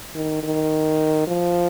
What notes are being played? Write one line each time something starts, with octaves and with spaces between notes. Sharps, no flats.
D#3
D#3
F3